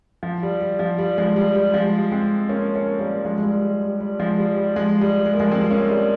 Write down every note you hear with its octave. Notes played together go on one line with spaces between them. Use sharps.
F3
G3
G3
F3
G3
F3 G#3
G3
G3
F3 G#3
G#3 C4
A#3 C#4
A#3 C#4
G3 A#3
F3 G#3
G#3
G3
G3
G3
G3
F3 G#3
G3
G3
F3 G#3
G3
G#3
A#3
F3 G#3
G#3 C4
A#3 C#4
G3 A#3